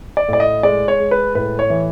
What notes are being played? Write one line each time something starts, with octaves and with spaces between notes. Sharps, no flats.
D5
A2 D5
D#5
G#3 D5
C#5
G#3
B4
A2 B4
C#5
E3